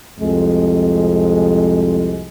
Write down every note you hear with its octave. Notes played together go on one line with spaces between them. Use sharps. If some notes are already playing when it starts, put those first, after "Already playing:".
C2 F2 G#3